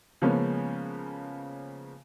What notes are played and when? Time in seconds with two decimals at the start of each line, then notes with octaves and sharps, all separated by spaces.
0.22 C#3 F3 G#3 A#3 B3 C#4